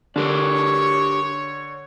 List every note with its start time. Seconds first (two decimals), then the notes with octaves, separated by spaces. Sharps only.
0.16 D3 D4 G4 A#4 C#5